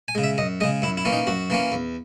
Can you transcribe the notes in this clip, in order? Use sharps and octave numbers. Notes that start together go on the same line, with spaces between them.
G#5
C#3 G#3
E5
F#2 D#5
C#3 G#3 D#5
F#2 E4
E4
E3 A#3 C#4
D#4
F#2 F#4
E3 A#3 C#4
E2